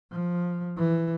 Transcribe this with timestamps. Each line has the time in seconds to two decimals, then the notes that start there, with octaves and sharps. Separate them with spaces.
0.11 F3
0.77 E3